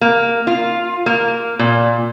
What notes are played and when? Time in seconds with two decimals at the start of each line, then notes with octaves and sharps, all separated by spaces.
0.01 A#3
0.47 F4
1.06 A#3
1.59 A#2